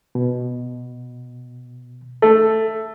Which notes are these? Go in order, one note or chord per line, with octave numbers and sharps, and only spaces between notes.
B2
A3 A4